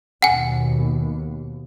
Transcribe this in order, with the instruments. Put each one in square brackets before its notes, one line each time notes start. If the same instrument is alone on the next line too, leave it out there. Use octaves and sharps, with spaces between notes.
[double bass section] D#2 B2 [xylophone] F#5 G#5